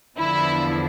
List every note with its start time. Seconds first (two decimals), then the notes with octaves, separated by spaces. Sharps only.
0.18 E2 D3 F3 E4